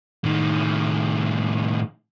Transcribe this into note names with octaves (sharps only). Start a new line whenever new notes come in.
A2 D#3